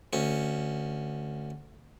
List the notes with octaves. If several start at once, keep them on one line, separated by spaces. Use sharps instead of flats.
D2 C#4